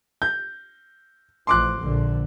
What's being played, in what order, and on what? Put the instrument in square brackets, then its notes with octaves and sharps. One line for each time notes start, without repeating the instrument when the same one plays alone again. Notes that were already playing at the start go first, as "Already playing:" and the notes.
[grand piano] G6
[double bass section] A1 F3 [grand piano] C6 D6 F#6
[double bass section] A#1 D3